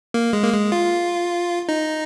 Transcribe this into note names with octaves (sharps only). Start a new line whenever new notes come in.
A#3
G#3
A#3
G#3
F4
D#4